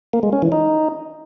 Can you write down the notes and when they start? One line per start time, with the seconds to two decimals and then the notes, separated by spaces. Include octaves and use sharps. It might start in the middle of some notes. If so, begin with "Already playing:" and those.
0.13 A#3
0.23 G#3
0.33 C#4
0.42 E3
0.52 D#4